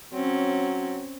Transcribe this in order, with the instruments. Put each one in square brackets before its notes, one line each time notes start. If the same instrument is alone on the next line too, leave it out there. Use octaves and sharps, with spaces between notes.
[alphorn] F#3 [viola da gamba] C4 C#4